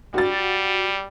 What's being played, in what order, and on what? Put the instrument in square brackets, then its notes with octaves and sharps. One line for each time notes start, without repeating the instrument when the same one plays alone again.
[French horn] G3 [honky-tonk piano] F#4 A6